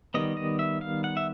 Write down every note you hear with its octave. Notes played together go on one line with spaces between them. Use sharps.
D#3 G3 B3 D#5
D#5
E5
F5
F#5
E5